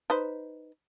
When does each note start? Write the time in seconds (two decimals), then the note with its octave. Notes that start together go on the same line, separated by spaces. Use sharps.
0.10 D#4 B4 C5